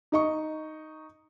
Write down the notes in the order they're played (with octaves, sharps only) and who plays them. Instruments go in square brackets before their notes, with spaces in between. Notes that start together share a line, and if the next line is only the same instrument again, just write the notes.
[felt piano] D#4 D#5 C#6